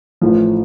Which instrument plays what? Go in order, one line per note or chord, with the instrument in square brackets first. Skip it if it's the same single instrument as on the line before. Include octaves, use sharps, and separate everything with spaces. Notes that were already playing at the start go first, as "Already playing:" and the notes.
[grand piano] A1 A2 F3